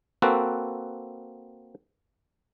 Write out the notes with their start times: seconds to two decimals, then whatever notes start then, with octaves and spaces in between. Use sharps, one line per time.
0.22 A#3 C4 F#4 A4 B4